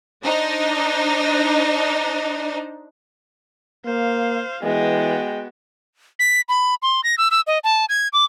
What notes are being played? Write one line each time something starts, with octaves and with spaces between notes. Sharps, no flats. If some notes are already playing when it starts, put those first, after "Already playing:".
D4 D#4 C5
A#3 C5 F5
E3 G#3 B3 F#4 G5
B6
B5
C6
A#6
E6
E6
D#5
A5
G#6
D6